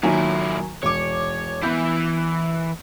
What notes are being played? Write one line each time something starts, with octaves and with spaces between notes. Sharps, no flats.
A#2 D#3 F#3 E4 G#5
E1 C#5 D6
E3 B3 E4 G6